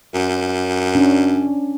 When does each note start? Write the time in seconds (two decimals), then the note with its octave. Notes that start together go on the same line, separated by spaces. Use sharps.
0.14 F#2
0.95 C#4 D4